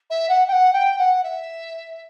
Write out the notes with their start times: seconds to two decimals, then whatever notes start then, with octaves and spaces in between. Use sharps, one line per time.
0.10 E5
0.29 F#5
0.48 G5
0.52 F#5
0.73 G5
0.98 F#5
1.23 E5